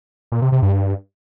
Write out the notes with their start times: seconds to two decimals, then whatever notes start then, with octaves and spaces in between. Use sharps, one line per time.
0.32 A#2
0.42 C3
0.52 C3
0.62 G2
0.73 G2